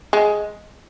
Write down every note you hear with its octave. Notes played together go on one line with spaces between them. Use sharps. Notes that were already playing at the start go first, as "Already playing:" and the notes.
G#3